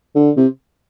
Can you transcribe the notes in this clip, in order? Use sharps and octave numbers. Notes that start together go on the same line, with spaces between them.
D3
C3